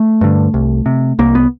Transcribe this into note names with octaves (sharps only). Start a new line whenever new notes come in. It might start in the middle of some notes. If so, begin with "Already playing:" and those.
Already playing: A3
G2 D3
C2
C3
C2 A#3
B3